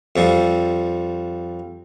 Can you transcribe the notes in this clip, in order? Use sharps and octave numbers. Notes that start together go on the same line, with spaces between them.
F2 F3 G3